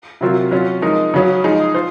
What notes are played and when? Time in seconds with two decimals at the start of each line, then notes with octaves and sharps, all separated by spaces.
0.21 C3 F#3 C4 F4 A#4
0.51 F#3 C#4 F4
0.82 F3 G#3 D#4 A#4
1.14 C#3 F#3 C#4
1.44 F3 G#3 D#4 G#4
1.75 F4 C5